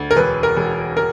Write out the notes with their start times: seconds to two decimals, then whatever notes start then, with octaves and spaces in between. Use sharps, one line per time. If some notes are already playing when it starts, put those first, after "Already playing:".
Already playing: D2
0.11 A#4
0.17 E1 B4
0.43 A#4
0.56 E1
0.97 A#4